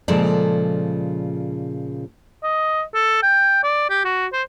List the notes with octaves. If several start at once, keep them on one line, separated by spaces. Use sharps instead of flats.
A#2 C#3 F3 G#3 A4 D5
D#5
A4
G5
D5
G4
F#4
C5